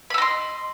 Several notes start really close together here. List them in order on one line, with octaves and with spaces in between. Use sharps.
B5 E6 D#5 C6